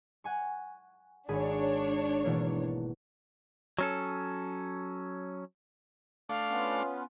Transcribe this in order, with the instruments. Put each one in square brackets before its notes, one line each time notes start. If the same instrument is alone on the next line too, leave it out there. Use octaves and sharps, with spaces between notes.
[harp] F#5 G#5 C#6
[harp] G#1 G#4 B5 [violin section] D4 C#5
[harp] B2 E3 A#3
[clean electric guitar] F#3 C#4 A4
[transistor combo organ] A3 D4 [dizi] F5
[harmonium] B3 C#4 F4